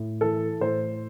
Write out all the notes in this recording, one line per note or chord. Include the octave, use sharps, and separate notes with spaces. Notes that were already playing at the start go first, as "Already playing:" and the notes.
Already playing: A2
E3 A4
A2 C5